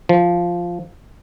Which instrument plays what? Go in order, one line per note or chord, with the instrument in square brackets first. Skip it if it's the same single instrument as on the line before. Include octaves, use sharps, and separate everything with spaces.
[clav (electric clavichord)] F3